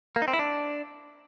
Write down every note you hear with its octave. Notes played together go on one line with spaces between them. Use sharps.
A#3
D#4
C4
E4
D4